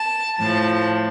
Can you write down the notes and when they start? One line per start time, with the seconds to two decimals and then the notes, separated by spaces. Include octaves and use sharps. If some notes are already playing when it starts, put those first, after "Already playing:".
Already playing: A5
0.39 A2 F3 A5